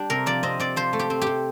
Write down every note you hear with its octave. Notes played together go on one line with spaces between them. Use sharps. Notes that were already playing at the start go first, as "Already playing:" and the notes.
Already playing: G3 D4 G4
C3 A#4
F3 D5
C4 D#5
C3 D5
F3 C5
A3
G4
C4
G4
C3